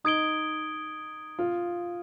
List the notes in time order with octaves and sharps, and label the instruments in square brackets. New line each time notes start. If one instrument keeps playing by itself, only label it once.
[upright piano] D#4 [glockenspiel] D#6 G#6 D7 G7
[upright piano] F4